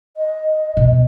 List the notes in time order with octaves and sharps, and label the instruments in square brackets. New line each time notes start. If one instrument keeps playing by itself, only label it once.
[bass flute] D#5
[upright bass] B2